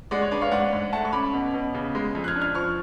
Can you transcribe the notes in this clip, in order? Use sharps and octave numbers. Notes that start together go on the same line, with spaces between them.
G#3 D5 F#5
C#5
D4 B4 D5
C#5 F5
G#2 D5 F#5
G#2
A3 F#5 A5
C#6
C#4 B5 D6
B2
B2
C#3
G#3
F2
F#6
F6 G#6
D4
F6 G#6
F3 C#6 F6